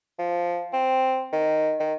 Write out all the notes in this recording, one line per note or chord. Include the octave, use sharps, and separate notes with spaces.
F3
C4
D#3
D#3